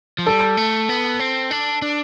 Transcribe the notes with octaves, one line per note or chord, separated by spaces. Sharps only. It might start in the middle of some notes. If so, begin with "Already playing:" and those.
F3
G3 A4
A3
B3
C4
D4
D4